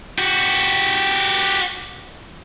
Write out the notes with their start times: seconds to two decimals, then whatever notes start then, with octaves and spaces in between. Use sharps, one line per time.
0.18 F#4 G4